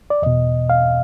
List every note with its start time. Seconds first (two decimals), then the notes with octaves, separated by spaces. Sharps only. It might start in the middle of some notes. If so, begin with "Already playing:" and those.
0.10 D5
0.22 E2 B2 D#5
0.70 F5